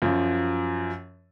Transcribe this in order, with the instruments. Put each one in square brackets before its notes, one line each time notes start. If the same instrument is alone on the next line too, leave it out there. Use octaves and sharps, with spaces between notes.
[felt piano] F#2 F3